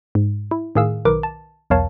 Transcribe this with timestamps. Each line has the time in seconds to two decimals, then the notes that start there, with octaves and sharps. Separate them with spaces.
0.15 G#2
0.51 E4
0.75 A2 D#3 G#4 F5 E6
1.05 B1 D#3 A#4 B4 D6
1.23 A5
1.70 B1 E2 A#4 C#5 F5 A5